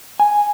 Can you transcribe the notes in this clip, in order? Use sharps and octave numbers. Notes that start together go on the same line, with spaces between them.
G#5